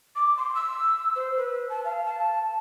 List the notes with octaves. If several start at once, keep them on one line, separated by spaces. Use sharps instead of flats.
D6
C6
E6
C5
B4
A5
F5
A5